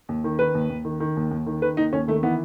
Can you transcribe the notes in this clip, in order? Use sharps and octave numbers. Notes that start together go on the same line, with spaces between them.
D#2
D#3
D#3 B4
D#2
D#2
D#3
D#3
D#2
D#2
D#3
D#3 B4
D#2 D#4
D#2 C#4
D#3 A3
E3 B3